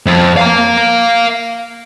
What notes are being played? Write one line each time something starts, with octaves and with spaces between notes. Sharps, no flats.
F2
F5 A#5